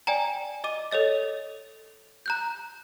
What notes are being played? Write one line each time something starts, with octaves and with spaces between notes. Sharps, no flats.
D5 G5 G#5 A#5
D#5 D6 D#7
A4 C#5 D#5 A6
A#5 F#6 G6